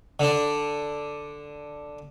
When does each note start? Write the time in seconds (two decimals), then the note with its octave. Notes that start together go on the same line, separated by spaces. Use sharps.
0.20 D3 D4